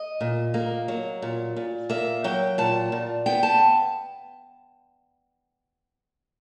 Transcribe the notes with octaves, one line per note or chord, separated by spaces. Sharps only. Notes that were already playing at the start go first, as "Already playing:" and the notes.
Already playing: D#5
A#2
A#3
F#3
A#2
A#2
A#3 E5
F#3 G5
A#2 A5
A#2
B3 G5
A5